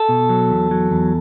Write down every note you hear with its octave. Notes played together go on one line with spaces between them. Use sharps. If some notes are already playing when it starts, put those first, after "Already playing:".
Already playing: A4
B2
F#3
E2
F#3
E2